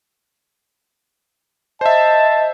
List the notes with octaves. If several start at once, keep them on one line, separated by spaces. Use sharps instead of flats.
C5 D#5 E5 A5